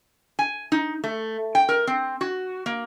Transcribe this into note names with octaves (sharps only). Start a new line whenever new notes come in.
G#5
D#4
A3
G5
A#4
C4
F#4
A#3